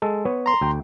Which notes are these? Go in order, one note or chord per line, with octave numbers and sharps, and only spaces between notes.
G#3 A4
B3 B4 C#5
A#5 C6
D2 G5